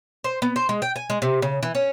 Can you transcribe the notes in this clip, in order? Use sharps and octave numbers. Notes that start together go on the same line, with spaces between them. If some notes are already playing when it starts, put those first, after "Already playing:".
C5
B3
C5
G#3
G5
G#5
G#3
C3
C#3
E3
C#4